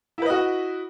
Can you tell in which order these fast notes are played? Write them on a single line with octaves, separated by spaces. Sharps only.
E4 B4 D#5 F#4